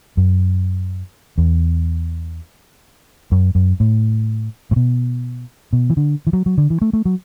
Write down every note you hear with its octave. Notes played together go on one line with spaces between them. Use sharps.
F#2
E2
F#2
F#2
A2
A2
B2
B2
E3
D3
E3
F#3
F#3
D3
E3
A3
A3
F#3